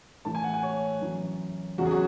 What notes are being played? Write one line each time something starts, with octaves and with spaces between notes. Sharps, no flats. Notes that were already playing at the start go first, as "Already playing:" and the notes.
A2 E3 A5
G#5
F#5
G#5
C#5
F#2 E3
E2 C#3 F#3 F#4
G#4
F#4